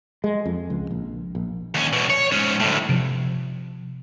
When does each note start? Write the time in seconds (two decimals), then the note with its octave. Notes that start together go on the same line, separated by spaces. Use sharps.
0.24 G#3
0.46 F2
0.70 C#2
0.91 A#1
1.35 A#1
1.75 D#2 C#4
1.93 E2 B2
2.10 C#5
2.32 G#2 C#4
2.60 D2 A2
2.89 C3 F3